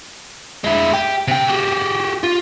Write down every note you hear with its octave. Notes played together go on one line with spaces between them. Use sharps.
G#3 E4
G4
C3 G5
F#4 G4
F4